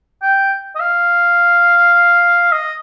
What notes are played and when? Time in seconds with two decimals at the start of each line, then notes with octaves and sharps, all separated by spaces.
0.22 G5
0.75 D#5
0.80 F5
2.52 D#5